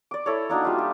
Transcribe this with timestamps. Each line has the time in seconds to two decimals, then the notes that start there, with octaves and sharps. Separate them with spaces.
0.11 D5 D6
0.26 E4 A4 C#5
0.49 A#3 D4 D#4 F#4
0.63 G3 F4 E5
0.78 G4